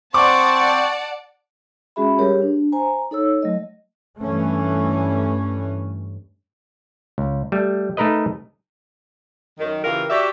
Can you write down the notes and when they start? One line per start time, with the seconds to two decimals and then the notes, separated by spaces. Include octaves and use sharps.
0.14 C4 C5 D5 F#5 A5 C#6 D6
1.96 G#3 C#4 F#4 G#4 E5 B5
2.19 G3 G4 G#4 A#4 C#5
2.42 D4
2.72 C5 G#5 A#5
3.11 D#4 A4 C#5 E6
3.42 F#3 A3 D#5
4.20 G2 E3 A3 C#4
7.18 C#2
7.52 G3 A3
7.97 A3 D#4 A#4 B4 D#5
9.59 F#2 D#3
9.84 C#3 E3 F4 G4 A#4
10.10 F#4 G4 D5 E5